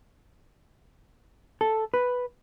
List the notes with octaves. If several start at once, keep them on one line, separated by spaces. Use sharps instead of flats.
A4
B4